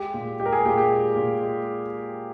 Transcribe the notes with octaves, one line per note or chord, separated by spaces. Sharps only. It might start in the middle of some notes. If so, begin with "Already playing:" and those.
Already playing: G#3 G4
A#2
G#3 G4
A#4
G#4
A#2 G4
G4
G#3
A#2
G#3